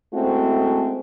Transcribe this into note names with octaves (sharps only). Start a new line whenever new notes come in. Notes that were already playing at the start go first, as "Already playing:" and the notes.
G#3 A3 C4 C#4 E4 F#4